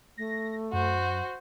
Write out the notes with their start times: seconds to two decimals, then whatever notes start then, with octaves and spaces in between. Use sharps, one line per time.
0.18 A3 A#6
0.73 F#2 F#4 C5